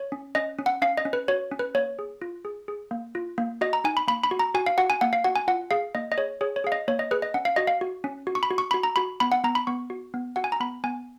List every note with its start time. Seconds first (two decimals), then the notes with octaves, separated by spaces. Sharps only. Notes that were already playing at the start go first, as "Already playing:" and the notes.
Already playing: C#5
0.12 C#4
0.35 C#4 D#5
0.59 C#4
0.66 F#5
0.82 C#4 F5
0.97 D#5
1.05 C#4
1.13 B4
1.28 F#4 C#5
1.51 C#4
1.59 B4
1.75 A#3 C#5
1.99 G#4
2.22 F4
2.45 G#4
2.68 G#4
2.91 A#3
3.15 F4
3.38 A#3
3.61 F#4 D#5
3.73 A#5
3.84 D#4 G#5
3.97 B5
4.08 A#3 B5
4.24 B5
4.31 F#4
4.39 A#5
4.55 F#4 G#5
4.66 F5
4.78 F#4 F#5
4.90 G#5
5.01 A#3 F#5
5.13 F5
5.24 F#4 F#5
5.36 G#5
5.48 F4 F#5
5.71 G#4 F5
5.95 A#3 D#5
6.12 D#5
6.18 G#4 C#5
6.41 G#4 C#5
6.56 C#5
6.64 G#4 F5
6.72 D#5
6.88 A#3 C#5
6.99 D#5
7.11 G#4 B4
7.22 D#5
7.34 C#4 F#5
7.45 F5
7.56 F#4 D#5
7.67 F5
7.81 F#4
8.04 C#4
8.27 F#4
8.35 C#6
8.43 B5
8.51 F#4
8.58 C#6
8.71 F#4 B5
8.83 A#5
8.96 F#4 B5
9.20 B3 B5
9.32 F#5
9.44 B3 A#5
9.55 B5
9.67 B3 C#6
9.90 F#4
10.14 B3
10.36 F#4 F#5
10.44 G#5
10.52 A#5
10.60 B3 B5
10.84 B3 G#5